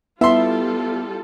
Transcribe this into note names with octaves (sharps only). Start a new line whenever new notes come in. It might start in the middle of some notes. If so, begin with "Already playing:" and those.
G3 B3 E4 F4 A4 E5 C6